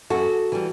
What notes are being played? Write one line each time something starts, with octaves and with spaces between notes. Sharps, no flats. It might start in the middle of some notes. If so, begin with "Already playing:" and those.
F#2 F#4 A4
E3 G3